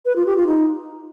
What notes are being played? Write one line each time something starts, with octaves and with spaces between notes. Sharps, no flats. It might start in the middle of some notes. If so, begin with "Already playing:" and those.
B4
F4
G4
F4
D#4